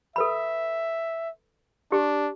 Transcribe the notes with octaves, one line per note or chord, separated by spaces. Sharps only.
A4 B4 E5 B5
D4 G4